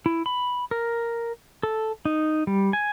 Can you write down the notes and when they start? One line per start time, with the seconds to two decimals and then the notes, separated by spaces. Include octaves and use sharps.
0.06 E4
0.26 B5
0.71 A#4
1.63 A4
2.05 D#4
2.47 G3
2.73 G#5